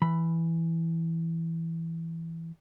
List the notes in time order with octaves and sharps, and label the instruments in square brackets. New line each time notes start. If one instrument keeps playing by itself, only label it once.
[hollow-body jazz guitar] E3 B5